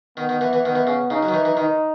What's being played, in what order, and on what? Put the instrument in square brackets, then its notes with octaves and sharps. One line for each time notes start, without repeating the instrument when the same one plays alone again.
[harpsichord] D#3 [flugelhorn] B3
[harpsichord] D#3
E3
E3
[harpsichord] D#3 [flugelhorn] B3
[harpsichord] E3
C#3
[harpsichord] C#3 [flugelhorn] D#4
[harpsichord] F#3
D#3
E3
E3
[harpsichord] D#3 [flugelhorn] D#4